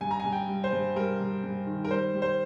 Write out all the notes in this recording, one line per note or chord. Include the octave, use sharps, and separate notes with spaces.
G2 G#5
A#5
G#5
G2
G5
G3
C5
G2
G3 A#4
G2
G2
D#3
A#4
G3 C5
G3
C5